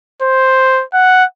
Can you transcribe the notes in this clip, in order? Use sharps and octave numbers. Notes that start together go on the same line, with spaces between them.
C5
F#5